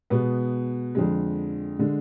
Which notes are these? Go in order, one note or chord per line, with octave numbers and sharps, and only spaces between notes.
B2 G#3 B3
F2 D3 G#3
D3 G#3